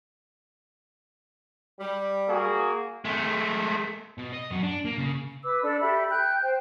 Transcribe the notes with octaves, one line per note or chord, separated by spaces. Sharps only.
G3
A#3 F#4 G#4
G#3 A3
B2
D#5
F#2 F#4
D4
A#3
C#3
B4 D6 E6
D4 A4 D5
G4 A4 E5 B5
G5 F#6 G6
C5 G5